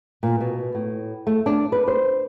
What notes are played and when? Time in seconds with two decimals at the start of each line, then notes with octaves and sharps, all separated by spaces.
0.23 A#2
0.41 B2
0.75 A2
1.27 A3
1.46 D4
1.72 B4
1.87 C5